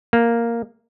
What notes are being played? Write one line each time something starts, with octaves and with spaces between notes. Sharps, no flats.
A#3